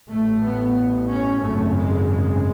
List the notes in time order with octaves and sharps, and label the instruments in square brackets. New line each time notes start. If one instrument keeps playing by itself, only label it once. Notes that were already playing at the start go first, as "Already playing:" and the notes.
[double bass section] A1 A2 A3
B3
C#4
G#1 F#2 C#3 A3
G#3
G#3